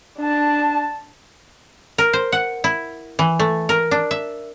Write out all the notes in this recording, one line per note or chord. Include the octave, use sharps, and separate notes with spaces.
D4 A5
A#4
C5
F#5
E4
E3
A3
A#4
D4
E5